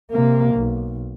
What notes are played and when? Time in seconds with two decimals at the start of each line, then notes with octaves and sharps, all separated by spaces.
0.11 C3 A#3
0.55 B1